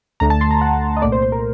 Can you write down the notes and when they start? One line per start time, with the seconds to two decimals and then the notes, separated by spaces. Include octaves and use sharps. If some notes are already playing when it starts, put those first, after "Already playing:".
0.20 D2 D3 A3 A#5
0.30 A5
0.41 C6
0.51 A#5
0.61 F#5
0.96 D#5
1.02 C2 A#2 A3 D5
1.12 C5
1.22 C5
1.32 A#4